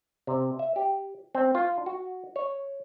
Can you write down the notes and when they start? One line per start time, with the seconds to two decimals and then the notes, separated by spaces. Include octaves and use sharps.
0.27 C3
0.59 E5
0.76 G4
1.35 C4
1.55 F4
1.86 F#4
2.36 C#5